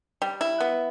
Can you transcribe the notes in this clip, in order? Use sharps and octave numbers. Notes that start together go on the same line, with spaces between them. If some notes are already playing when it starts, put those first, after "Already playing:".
G3
E4
B3